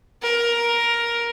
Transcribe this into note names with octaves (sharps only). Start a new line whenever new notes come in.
A#4